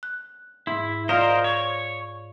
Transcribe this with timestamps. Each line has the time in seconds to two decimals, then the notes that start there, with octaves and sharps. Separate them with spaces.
0.03 F#6
0.67 G#2 E4
1.09 F4 A#4 C5 D5 D#5 F5
1.44 C#5